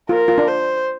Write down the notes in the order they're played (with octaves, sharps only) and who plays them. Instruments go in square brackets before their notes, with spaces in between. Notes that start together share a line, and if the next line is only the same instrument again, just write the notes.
[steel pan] F4 [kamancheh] A#4
[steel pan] F4
D4
[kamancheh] C5